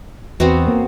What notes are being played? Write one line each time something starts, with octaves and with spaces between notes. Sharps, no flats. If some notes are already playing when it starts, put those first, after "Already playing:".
E2 B3 C4 F#4
A#3